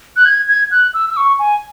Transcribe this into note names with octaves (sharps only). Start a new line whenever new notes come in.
F#6
G#6
G#6
F#6
E6
E6
C#6
G#5